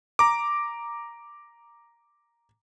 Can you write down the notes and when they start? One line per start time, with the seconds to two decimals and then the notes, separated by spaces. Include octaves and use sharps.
0.19 A#5 D6